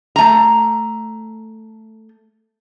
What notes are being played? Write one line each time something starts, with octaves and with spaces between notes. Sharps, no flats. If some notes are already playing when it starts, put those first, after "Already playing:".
A3 A#5